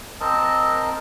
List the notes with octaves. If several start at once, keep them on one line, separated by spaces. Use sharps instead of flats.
C4 A#4 D#5 A5